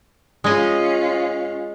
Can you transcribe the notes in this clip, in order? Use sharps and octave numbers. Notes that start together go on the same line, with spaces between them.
G#3 C#4 F4 D#5